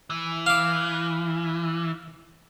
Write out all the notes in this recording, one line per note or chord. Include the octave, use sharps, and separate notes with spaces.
E3
F5 D6